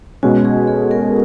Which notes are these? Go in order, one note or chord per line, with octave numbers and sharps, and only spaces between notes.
B2 G#3 C#4 F#4
G#4
A4
A#4